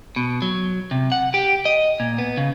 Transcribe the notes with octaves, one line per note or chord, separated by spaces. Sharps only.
B2
F#3
C3
F#5
G4
D#5
A#2
B3
C#3